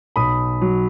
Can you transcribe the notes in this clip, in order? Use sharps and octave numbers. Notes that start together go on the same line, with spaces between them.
B1 B5 D#6
F#3